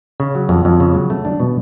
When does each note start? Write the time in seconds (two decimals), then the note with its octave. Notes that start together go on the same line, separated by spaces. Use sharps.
0.20 C#3
0.35 F#3
0.49 F2
0.65 F2
0.80 C#3
0.95 F#3
1.10 A3
1.25 D4
1.40 B2